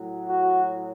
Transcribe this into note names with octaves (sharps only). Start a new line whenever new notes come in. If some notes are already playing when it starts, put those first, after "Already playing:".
Already playing: A2 F#3
F#4